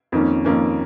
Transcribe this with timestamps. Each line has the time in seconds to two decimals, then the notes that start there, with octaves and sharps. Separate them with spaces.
0.12 F2 D#3 A#3 C#4
0.45 F2 D#3 A#3 C#4